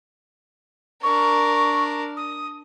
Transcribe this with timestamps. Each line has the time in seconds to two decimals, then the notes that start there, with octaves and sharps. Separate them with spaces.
1.03 D4 A#4 C#6
2.17 D#6